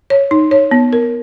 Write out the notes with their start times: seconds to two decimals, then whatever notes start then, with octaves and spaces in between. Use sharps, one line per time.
0.10 C#5
0.31 D#4
0.51 C#5
0.71 B3
0.93 A#4